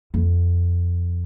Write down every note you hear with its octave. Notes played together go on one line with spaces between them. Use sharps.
F2